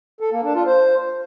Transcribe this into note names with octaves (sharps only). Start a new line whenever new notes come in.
A4
A#3
D4
F4
C5